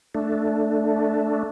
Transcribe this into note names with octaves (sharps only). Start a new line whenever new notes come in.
A3 D4